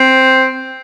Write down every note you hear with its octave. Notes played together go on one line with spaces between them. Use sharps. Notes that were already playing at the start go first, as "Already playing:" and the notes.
Already playing: C4